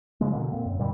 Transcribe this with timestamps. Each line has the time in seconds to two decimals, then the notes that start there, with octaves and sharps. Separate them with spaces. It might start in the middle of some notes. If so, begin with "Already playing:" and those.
0.21 C#3 F3 G#3 A#3
0.33 B2 D3 A#3
0.52 A#2 C4
0.66 F#2
0.79 F2 A#2 D3 G3